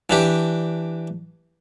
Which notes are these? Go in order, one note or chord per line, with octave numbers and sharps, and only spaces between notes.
E3 D4 G4